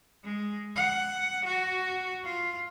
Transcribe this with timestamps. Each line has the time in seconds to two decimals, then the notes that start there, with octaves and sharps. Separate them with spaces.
0.24 G#3
0.76 F#5
1.45 F#4
2.25 F4